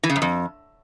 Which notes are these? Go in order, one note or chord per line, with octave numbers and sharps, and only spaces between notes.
E3
C#3
F#2
F2